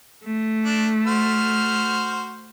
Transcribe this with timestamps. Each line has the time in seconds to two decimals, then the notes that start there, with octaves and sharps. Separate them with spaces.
0.24 A3
0.65 D4
1.07 F#4 C5 F6